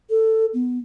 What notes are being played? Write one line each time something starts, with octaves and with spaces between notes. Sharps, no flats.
A4
B3